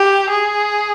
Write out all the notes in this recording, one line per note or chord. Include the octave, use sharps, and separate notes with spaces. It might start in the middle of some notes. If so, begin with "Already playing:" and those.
Already playing: G4
G#4